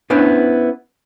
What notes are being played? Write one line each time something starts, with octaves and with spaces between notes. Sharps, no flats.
B3 C#4 D4 E4 C5